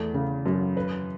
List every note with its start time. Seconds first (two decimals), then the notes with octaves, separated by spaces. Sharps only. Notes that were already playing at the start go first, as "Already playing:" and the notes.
Already playing: E2 A3
0.14 C#3
0.46 F#2
0.77 B4